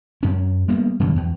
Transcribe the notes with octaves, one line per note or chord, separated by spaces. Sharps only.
F#2 C#4
G3 A#3 B3
F#2 B2 D3 D#3
E2